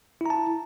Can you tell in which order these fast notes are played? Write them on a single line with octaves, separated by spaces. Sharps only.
E4 A#5 A5